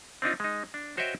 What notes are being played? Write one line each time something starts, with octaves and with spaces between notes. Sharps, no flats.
C4 D4 D#4 F4
G#3 D#4
D4
F#4 C5 C#5 D#5 E5 G5